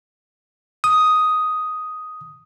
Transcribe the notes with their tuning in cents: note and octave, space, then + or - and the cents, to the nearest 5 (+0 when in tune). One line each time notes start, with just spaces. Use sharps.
D#6 +5